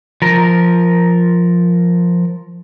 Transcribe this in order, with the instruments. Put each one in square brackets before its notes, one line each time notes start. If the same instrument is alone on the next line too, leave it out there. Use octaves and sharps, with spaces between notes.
[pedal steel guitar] F3 A#4